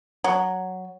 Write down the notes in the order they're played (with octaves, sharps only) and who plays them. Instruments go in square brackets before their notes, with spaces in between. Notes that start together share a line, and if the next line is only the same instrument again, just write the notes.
[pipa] F#3